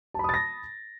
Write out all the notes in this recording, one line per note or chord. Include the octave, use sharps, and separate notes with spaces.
A5 B5 D#6 A6 A#6